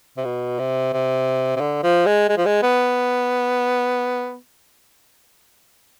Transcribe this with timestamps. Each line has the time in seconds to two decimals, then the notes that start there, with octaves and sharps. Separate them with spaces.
0.17 C3
0.24 B2
0.59 C3
0.93 C3
1.56 C3
1.60 D3
1.83 F3
2.06 G#3
2.29 G#3
2.37 F3
2.46 G#3
2.63 B3